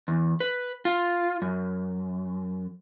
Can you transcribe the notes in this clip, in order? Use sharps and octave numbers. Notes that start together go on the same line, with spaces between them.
E2
B4
F4
F#2